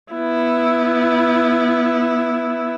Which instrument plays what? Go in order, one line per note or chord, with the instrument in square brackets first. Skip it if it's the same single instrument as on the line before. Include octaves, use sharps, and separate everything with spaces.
[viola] B3 E4